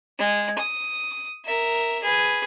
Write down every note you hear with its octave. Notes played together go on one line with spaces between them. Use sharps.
G#3
D#6
A#4 E5
G#4 B4